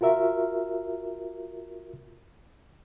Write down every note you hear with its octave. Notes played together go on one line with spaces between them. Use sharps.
F4 F#4 A#4 E5